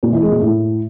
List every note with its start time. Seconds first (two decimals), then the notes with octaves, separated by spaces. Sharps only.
0.03 A#2
0.12 E3
0.22 G#3
0.32 A#2
0.41 A2